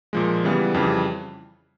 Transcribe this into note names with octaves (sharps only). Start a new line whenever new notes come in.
A#2 F3 G#3
C#3 E3 G3 B3
F2 C#3 E3 G3